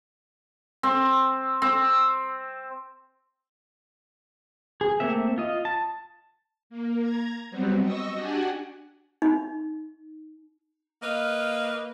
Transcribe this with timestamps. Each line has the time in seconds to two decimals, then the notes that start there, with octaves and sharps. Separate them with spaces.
0.83 C4
1.62 C4
4.81 G#4
5.00 A3 A#3 C4 E5
5.38 F4 D#5
5.65 A5
6.70 A#3
7.00 A#5 G#6
7.51 F#3 G3 B3 C4
7.82 D#5 C#6 E6 A#6
8.14 D4 F#4 G4 D5 F#5 G#5
9.22 D#4
11.03 A#3 B4 D#5 F5